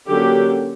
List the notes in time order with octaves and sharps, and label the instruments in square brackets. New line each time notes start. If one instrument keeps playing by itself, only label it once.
[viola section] D3 F#3 A#3 C#4 G4